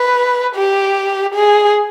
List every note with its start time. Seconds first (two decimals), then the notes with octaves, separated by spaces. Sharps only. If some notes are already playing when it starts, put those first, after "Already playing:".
Already playing: B4
0.55 G4
1.34 G#4